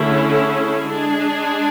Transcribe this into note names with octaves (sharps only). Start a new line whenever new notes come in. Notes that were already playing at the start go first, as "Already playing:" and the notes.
Already playing: D3 A3 C#4 E4 G#4
G#3 D4 G#4